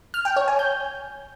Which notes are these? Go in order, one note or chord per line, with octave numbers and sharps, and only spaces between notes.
F6
G5
C#5
G#5
G6